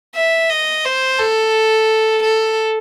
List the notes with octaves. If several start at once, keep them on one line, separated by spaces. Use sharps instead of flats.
E5
D#5
C5
A4
A4